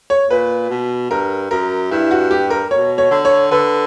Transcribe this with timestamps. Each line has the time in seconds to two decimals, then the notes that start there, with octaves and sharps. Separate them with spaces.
0.10 C#5
0.30 A#2 B4
0.70 B2
1.10 G2 A#4
1.51 F#2 A#4
1.91 G2 E4
2.11 F#4
2.31 G4
2.50 A#4
2.71 B2 C#5
2.98 C#5
3.11 D3
3.25 C#5
3.51 D3 B4